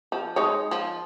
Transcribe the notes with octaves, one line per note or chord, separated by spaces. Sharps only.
F3
G#3 D#4 C#5
F3